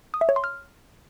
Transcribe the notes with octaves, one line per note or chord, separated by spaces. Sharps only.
D#6
E5
C#5
C6
F6